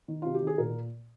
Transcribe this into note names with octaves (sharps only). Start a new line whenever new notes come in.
D#3
C3 F4
G4
D#3 G#4
A#2 A#4